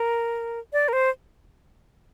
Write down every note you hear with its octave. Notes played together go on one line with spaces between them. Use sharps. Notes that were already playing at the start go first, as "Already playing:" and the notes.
Already playing: A#4
D5
A#4
C5